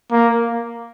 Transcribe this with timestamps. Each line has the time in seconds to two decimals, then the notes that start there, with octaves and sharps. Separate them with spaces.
0.11 A#3